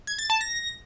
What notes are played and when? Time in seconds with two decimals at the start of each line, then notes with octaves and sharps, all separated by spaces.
0.07 G#6
0.18 A6
0.30 A5
0.41 A#6